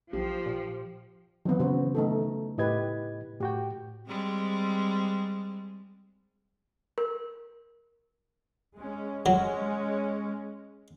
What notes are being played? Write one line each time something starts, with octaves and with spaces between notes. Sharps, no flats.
A#1 F3 G4
A#2 G4
D#3 E3 F#3 B3 C4
C#3 F#4 C5
A3 D#4 A4
A2 E4 G4 B4 D#5 G#6
A2 F#4 G4 G5
G3 G#3 C4
A#4
G#3 C#4
F#3 G#3 C#4